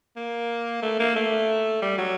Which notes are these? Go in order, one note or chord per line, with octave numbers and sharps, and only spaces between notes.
A#3
A3
A#3
A3
G3
F#3